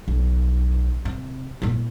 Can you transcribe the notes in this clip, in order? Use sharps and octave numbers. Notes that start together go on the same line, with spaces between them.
B1
C3
A#2 E4